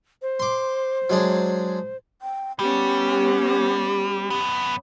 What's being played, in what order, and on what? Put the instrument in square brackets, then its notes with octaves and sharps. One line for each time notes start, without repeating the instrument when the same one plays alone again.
[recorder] C5
[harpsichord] C6 D6
F#3 G#3 D4
[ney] G5
[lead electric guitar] G3 [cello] B3 C#4 [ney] G4
[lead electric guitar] F#2 B3